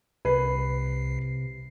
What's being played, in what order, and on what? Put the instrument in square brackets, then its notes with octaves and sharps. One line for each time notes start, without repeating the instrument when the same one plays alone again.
[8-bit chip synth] C2 C7 [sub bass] C3 [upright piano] B4